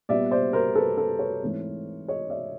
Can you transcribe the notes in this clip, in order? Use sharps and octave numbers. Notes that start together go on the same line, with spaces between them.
A#2 G3 B3 D5 E5
C5 D5
A#4 C5
A4 B4
A4 B4
B4 C#5
G#2 E3 A3 C4
C#5 D#5
D5 E5